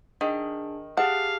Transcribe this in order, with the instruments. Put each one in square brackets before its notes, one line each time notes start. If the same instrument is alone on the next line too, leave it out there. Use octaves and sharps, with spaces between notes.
[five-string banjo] D#3 [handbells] D4 G#4
[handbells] G4 G#4 A5 [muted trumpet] F5 [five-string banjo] F#5